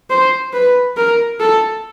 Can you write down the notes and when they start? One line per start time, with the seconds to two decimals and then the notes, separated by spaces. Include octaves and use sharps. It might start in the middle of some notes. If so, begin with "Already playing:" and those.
0.10 C5
0.54 B4
0.97 A#4
1.40 A4